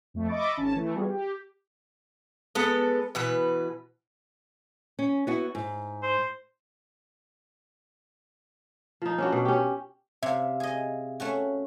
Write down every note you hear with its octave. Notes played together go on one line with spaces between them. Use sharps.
F2 A3
D#5 E5 B5 C#6 D6 A6
G#1 C#4 A5
E3 A3
G3 B3 F4 F#4 G#4
G4
G#3 B3 A4 B4
B2 E3 B4
C#4
B3 E4 F#4
G#2
C5
F3 D#4
C#4 D4 F#4
B2
C#4 G4
C3 E5 F5
G#4 D#5
A3 C#4 F#4